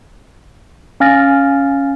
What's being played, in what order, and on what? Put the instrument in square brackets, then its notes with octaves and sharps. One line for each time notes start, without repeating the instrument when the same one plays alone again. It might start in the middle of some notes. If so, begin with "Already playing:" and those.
[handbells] C#4 F5 G#5 F6 A6 A#6